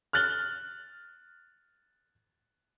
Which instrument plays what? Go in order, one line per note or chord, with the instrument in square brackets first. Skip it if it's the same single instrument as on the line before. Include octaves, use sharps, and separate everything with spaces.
[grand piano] F6 F#6 A6 F#7 G7